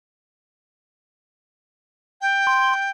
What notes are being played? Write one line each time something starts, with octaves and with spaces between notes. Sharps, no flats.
G5
C6